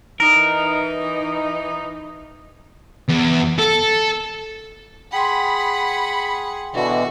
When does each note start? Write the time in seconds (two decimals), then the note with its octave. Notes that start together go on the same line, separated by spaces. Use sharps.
0.20 E3 D#4 A#4
3.08 E2
3.58 A4
5.12 G#4 F#5 G5 B5 C6
6.74 B2 D3 E3 F#4